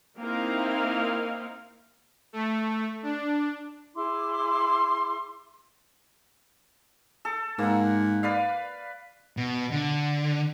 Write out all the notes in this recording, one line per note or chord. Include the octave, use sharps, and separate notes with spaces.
A#3 C4 D#4 E4 A#4 F5
A3
D4
E4 G#4 C6 D6
A4
G#2 A#3 F#5
B4 D5 F5
B2
D3